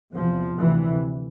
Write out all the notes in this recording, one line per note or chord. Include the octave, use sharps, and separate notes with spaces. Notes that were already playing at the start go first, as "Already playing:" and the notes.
E2 C3 F3
D2 C3 E3